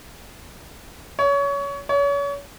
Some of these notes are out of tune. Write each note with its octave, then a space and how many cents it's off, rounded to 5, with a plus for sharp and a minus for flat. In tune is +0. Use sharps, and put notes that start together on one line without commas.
C#5 +25
C#5 +35